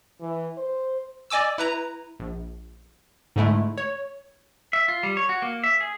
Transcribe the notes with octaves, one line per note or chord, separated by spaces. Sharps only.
E3
C5
D5 D#5 G#5 D6 E6
E4 B4 A#5
A#1
G#2 D3 G#3 A3 E4
C#5
E5
F4
G3
C#5
F#4
A#3
E5
G#4